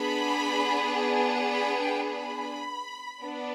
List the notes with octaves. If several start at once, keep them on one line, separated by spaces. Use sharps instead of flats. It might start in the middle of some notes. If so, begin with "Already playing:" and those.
Already playing: B3 D4 G#4 B5
B5
G5
B5
B3 D4